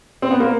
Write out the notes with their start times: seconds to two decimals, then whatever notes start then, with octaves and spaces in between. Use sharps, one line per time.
0.22 C4
0.31 B3
0.40 A#3